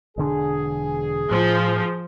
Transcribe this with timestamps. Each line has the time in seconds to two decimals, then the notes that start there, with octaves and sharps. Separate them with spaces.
0.17 E1 D3 D4 G#4
1.31 A2 F3